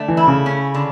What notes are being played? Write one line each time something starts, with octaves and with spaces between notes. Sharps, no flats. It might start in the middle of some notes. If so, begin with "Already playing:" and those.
Already playing: D3 A3
E3
E4
C#3
C#4
D3